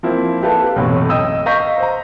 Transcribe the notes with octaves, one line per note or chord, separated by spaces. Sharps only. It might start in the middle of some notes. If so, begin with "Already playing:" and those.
F3 A#3 C4 E4
G4 A4 B4 F5 A5
B1 F#2 A2 C3 E3
D#5 G5 D#6 E6
D#5 F5 C#6 G6 A#6 B6
C5 A#5